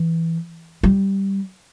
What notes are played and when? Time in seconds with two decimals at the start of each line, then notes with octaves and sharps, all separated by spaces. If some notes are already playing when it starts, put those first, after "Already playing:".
Already playing: E3
0.83 G3